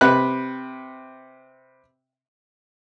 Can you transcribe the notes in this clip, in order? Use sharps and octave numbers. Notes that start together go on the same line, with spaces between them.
C3 B4 F#6